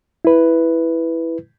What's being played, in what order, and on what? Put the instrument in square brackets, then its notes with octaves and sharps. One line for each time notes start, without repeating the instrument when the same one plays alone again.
[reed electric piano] E4 B4